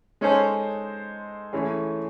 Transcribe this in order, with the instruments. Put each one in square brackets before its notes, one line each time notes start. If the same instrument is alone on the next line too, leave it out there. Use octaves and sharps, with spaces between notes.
[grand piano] G#3 D#4 A4 C5 [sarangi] C#4
[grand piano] E3 A3 C#4 E4 G#4